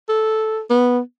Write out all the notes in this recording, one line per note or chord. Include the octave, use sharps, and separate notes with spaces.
A4
B3